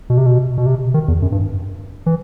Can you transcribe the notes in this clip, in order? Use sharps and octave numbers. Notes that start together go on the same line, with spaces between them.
B2
C3
B2
B2
C3
D#3
E2
F#2
G2
E3